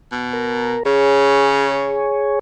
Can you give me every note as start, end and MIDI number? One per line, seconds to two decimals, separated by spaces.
0.12 0.76 47
0.33 0.83 70
0.86 2.10 49
0.86 2.39 68
0.86 2.39 73